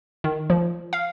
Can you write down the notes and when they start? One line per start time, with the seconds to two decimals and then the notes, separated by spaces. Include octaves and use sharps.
0.24 D#3
0.50 F3
0.93 F5